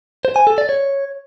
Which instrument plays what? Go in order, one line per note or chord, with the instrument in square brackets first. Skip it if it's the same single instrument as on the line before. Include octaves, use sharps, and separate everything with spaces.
[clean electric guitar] C5
G#5
A4
D5
C#5